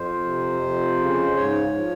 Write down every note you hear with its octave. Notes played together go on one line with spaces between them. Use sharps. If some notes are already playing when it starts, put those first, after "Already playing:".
Already playing: F2 C5
C3
F2
C#3
G#2 C#5
F3